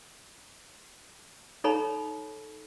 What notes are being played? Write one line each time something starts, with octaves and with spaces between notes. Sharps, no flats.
D#4 A4 C#5 A#5 B5